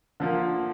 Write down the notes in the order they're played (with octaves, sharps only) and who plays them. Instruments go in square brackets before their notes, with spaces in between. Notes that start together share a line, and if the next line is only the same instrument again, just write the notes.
[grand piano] D3 F3 A#3